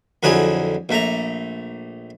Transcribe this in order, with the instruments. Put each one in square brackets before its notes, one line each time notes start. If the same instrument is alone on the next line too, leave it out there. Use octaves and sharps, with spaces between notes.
[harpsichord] F2 D3 F#3 E4 G#4
A#1 A3 A#5